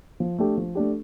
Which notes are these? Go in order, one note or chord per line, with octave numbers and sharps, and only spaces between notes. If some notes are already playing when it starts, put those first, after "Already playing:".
F3
A3 D4 G4
F3
A3 D4 G4